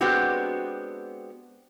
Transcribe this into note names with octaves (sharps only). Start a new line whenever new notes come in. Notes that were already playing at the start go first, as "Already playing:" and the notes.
G#3 B3 C4 D4 F#4 G4